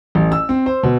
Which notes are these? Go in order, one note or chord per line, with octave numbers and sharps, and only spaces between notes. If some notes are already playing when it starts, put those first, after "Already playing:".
A1
E6
C4
C5
B2